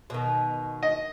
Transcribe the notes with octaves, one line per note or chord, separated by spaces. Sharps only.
B2 D#3
D#5